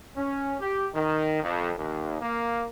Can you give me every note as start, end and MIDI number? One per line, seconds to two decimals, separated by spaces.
0.17 0.56 61
0.61 0.87 67
0.95 1.43 51
1.43 1.72 41
1.78 2.19 39
2.22 2.66 58